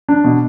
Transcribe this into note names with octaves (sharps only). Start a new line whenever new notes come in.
D4
B2